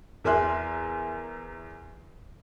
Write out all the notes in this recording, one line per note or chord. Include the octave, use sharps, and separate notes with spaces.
E2 A#4 E5 G#5 C6 F#6